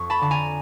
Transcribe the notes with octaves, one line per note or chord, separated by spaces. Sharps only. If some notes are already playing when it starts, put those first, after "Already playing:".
Already playing: F2 C#6
A5 B5
D3 A5
G#5 A#5